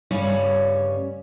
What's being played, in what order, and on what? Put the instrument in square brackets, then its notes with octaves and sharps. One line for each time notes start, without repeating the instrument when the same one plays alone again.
[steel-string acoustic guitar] D2 G2 C#3 G3 C#4 C#5